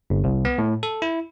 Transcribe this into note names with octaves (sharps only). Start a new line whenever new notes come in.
G1
C2
B3
A2
A4
E4